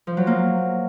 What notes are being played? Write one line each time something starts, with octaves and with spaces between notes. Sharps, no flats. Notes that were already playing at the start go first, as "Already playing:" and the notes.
F3
F#3
A#3